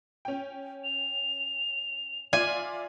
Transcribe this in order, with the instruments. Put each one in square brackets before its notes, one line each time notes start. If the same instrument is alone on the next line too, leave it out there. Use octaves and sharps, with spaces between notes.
[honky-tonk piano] C#4 G5
[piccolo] F7
[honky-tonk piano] F4 D5 E5 [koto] G#5